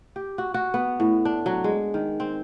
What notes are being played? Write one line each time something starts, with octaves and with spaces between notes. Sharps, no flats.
G4
F#4
F#4
B3
A2
D4
F#3
G#3
D#3
C4